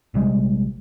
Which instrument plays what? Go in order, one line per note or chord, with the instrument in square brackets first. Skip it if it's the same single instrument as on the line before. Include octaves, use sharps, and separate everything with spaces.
[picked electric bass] A#1 C3 G3 G#3